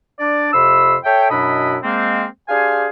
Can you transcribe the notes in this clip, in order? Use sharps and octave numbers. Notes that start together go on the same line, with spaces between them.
D4 D5
F2 C3 B5 C6 E6
A4 C#5 E5 G5
F#2 B2 D4 E4 D#5 B5
G#3 A#3 C4
D4 G4 G#4 C5 F5 G#5